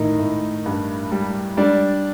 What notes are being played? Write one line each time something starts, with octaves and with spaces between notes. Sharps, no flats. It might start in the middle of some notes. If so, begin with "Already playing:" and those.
Already playing: A2 D#3 D#4
A2
G2
G3
G3 D4 D5